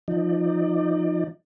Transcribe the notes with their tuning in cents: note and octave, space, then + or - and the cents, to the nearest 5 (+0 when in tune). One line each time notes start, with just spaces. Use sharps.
F3 +0 D#4 +0 D5 +30